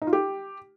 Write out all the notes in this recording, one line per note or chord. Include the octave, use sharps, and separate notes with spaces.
D#4
F4
G4